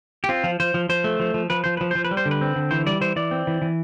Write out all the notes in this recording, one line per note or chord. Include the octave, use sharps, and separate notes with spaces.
G4
C4 F4
F3
F3 C5
F3
F3 C5
A3
F3
F3
F3 B4
F3 C5
F3 B4
F3 C5
B4
G3
C5
D3
B4
C4
D3
E3 C5
G3 D5
E3 C5
E3 D5
C4
E3
E3